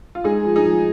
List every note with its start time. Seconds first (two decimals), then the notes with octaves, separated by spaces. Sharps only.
0.15 F4
0.24 G#3 D#4 G#4
0.45 F3
0.56 D#4 G#4
0.65 F3